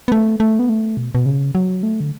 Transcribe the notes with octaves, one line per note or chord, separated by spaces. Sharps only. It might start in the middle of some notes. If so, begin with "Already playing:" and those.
B3
A3
A3
B3
A3
B2
B2
C#3
F#3
A3
D3